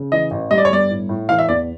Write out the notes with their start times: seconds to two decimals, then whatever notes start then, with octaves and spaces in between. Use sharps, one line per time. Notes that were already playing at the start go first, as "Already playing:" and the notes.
Already playing: C#3
0.12 E3 D#5
0.31 A1
0.51 G3 D#5
0.58 D5
0.65 C#5
0.71 G1 D5
0.90 A2
1.09 A2
1.29 E3 F5
1.39 E5
1.48 E2 D5